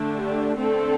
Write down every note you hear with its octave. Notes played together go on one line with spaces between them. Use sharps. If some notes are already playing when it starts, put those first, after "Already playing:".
Already playing: D3 A3 D4
G4
D3 A3 C4 A4